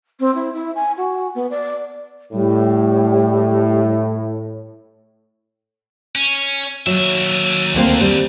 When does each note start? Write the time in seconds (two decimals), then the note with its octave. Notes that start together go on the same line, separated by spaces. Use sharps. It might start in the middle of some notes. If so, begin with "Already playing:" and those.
0.20 C4
0.35 E4
0.54 E4
0.75 G#5
0.97 F#4
1.35 B3
1.50 D5
2.33 A2 G3
6.16 C#4
6.87 D#2 F#3 E5
7.74 D2 A#3 C4
8.01 G3 C4